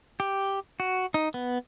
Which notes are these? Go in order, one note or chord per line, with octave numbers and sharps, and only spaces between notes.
G4
F#4
D#4
B3